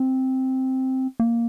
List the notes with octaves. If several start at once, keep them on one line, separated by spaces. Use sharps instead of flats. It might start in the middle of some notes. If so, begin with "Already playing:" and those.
Already playing: C4
A#3